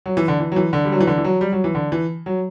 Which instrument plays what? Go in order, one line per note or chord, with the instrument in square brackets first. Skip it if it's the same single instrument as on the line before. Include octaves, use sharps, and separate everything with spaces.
[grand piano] F#3
E3
D3
E3
F#3
E3
D3
G3
F#3
E3
D3
E3
F#3
G3
F#3
E3
D3
E3
F#3